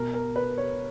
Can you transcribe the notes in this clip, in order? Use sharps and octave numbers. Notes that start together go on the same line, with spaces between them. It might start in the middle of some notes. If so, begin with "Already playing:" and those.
Already playing: B2 A#4
A#4
B4
C#5